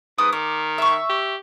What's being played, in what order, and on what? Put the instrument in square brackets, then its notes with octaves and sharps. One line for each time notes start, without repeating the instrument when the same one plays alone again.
[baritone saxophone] G#2 [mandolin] B4 D#6 E6
[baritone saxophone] D#3 [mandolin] D6
[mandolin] E5 C#6
[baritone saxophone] G4